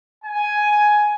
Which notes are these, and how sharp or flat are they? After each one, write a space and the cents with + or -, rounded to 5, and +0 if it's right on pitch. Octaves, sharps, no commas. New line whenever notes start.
G#5 +10